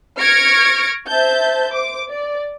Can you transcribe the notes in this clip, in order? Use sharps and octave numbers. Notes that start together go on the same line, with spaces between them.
C#6 F6 G#6 A#6 C#7 D7
C5 E5 A5 G6
C5 D6
D5